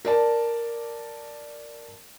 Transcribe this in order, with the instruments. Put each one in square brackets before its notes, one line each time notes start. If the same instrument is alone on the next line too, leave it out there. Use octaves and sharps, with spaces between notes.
[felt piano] A#4 D5 A5